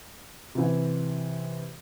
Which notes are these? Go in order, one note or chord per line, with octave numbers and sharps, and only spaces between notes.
C3 E3